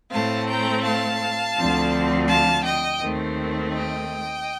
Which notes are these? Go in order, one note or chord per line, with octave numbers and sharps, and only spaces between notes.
A2 A3 C4 F5 A5
G5 A#5
F5 A5
D2 D3 F3 C4
F5 A5
D#5 G5
D#2 D#3 A3 C4
D#5 G5